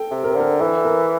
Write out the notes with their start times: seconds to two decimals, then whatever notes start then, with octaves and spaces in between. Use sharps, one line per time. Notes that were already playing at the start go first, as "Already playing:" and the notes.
Already playing: A4 G5
0.11 C3
0.24 A#4
0.31 C5
0.36 D3 A#4
0.60 E3 A4
0.84 A#4